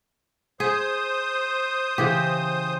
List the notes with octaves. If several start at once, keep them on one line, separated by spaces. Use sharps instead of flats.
G#4 C5 D#6
C#3 E3 G4